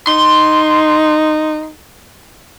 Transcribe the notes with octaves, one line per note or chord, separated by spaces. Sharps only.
D#4 C6